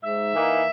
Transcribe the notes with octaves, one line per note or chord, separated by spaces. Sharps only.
G#2 E5
E3 A#3 D#4